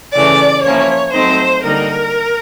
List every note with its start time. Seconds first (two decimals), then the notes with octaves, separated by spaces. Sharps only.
0.15 C#3 E3 A3 C#4 D5
0.65 F3 A#3 C#4 E4 C#5
1.13 F#3 A3 C4 D#4 C5
1.63 D3 G3 A#3 D#4 A#4